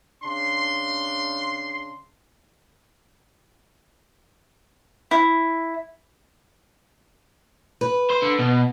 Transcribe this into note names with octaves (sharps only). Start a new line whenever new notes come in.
C#3 D4 C6
E4
B4
C5
D3
B2